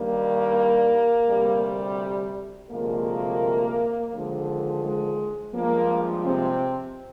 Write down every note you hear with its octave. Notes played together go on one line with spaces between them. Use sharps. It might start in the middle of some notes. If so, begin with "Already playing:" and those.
Already playing: G2 D#3 G3 A#3
D2 C3 G3
D2 C3 F3 G#3 A#3
D#2 D3 F3 G#3
G#3
G2 F3 G#3 A#3
C3 C4